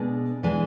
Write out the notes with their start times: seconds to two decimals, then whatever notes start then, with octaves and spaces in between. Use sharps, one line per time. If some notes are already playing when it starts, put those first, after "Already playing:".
Already playing: B2 G#3 D4
0.43 E3 G#3 D4 G#5